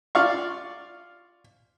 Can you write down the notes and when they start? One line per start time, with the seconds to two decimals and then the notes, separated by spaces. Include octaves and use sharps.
0.15 F4 D5 F5 C#6